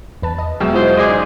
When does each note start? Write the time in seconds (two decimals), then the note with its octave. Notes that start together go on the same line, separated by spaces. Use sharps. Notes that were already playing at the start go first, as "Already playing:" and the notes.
0.22 E2 B4 A5
0.38 D#5
0.60 B2 F#3 G#3 E5 G5 E6
0.73 E4 F4 C5 D#5
0.97 C#2 G#4 D5 D#5 C6 D6
1.09 G#2